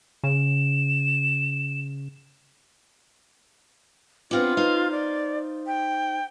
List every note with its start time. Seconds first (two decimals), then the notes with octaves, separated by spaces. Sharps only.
0.24 C#3 E7
4.31 B3 C4 D4 F4
4.57 D#4 C5 F5
4.91 D5
5.67 G5